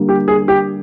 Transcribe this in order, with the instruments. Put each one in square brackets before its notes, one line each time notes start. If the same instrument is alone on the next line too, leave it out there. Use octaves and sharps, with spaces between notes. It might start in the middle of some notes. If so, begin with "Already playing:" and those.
Already playing: [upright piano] D3 G3 A#3
[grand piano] G4
G#4
G4